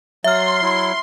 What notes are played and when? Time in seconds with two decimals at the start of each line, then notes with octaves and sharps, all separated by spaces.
0.24 F#3 E5 C6 F6
0.62 F#3 E4